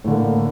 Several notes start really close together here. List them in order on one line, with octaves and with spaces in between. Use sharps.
A2 D3 A#3